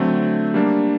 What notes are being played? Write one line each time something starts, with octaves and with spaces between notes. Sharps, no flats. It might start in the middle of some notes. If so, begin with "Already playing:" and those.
Already playing: D3 F#3 A3 C4
G3 A#3 D4